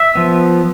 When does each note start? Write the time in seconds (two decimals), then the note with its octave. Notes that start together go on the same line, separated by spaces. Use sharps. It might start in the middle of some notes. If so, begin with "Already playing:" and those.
Already playing: E5
0.15 F3 B3